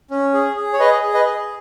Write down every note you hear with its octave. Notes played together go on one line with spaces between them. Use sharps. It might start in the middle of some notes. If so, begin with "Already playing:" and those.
C#4
G#4
G#4
C#5
G#4 B4 D#5
G#4
B4 D#5
G#4